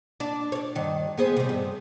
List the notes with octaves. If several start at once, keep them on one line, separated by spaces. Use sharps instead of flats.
D4
C#5 D5
G2 D#3
B3 G#4 C5
C3 G3
G2